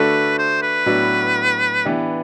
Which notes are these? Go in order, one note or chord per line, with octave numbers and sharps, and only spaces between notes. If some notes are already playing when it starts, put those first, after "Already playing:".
Already playing: D3 A3 D4 F#4 A4 B4
C5
B4
A2 F#3 B3 D4 F#4
E3 B3 D4 G4